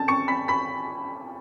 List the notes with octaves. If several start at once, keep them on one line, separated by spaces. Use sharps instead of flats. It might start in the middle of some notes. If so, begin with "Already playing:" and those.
Already playing: A5 A6
C#6 C#7
B5 B6
B5 B6